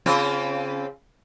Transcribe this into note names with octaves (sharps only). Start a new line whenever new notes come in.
C#3 C4 F4